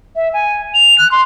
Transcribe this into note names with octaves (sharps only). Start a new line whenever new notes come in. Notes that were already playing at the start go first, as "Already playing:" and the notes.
E5
G#5
F7
F#6
C6